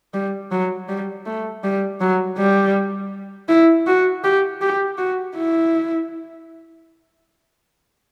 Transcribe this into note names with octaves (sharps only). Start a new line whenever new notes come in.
G3
F#3
G3
A3
G3
F#3
G3
E4
F#4
G4
G4
F#4
E4